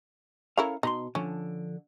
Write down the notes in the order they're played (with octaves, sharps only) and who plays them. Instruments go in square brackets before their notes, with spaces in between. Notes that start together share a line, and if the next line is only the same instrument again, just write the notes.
[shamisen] C#4 E4 A#4 [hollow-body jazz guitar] A4 C#5 F5
[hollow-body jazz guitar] B2 B5 C6 [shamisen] D#4
[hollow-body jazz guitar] D3 F3 [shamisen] C#4